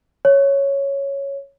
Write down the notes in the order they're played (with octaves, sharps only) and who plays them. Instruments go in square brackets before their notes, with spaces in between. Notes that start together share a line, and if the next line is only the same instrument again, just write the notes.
[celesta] C#5